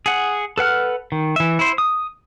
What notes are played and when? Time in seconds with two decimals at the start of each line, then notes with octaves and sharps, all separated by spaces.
0.06 G#4 F#5
0.58 A4 B4 F#5 F6
1.12 D#3
1.36 E3 E5
1.59 E4 C5
1.78 D#6